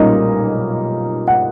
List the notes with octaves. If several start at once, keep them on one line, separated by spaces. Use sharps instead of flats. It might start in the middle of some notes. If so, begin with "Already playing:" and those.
Already playing: B1 A#2 G3 A#3 C#4 D#4 D#5
F#5